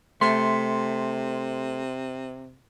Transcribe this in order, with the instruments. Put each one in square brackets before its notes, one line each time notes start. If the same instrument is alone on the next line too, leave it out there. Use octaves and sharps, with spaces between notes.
[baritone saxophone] C3 [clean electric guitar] A3 [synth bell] C6